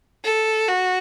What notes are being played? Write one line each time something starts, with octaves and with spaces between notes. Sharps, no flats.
A4
F#4